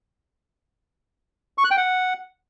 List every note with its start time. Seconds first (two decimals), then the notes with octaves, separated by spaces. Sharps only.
1.58 C#6
1.64 F#6
1.71 G5
1.77 F#5